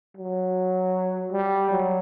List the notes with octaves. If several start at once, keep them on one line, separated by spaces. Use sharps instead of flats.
F#3
G3
F#3